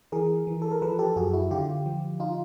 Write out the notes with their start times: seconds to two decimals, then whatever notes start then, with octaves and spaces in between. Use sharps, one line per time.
0.12 E3 G#4 A#4
0.47 E3
0.62 A4
0.72 A#4
0.82 F3 A4 B4
0.99 G4 A4
1.16 F#2 F#4 G#4
1.33 E4 F#4
1.51 D3 F4 G4
1.86 F3
2.20 D#4 F4